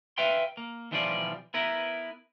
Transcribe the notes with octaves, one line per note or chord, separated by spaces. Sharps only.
B4 E5 F5 G5 C6
A#3
B1 E3 F3 G3 F4 D5
B3 E4 A#4 B4